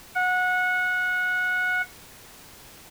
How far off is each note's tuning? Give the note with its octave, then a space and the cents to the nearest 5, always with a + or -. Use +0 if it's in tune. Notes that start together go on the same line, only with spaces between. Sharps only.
F#5 -20